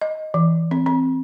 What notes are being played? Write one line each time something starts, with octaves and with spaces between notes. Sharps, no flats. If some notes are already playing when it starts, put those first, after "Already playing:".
D#5
E3
C4
C4